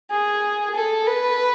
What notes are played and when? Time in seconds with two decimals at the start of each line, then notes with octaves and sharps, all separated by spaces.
0.11 G#4
0.75 A4
1.07 B4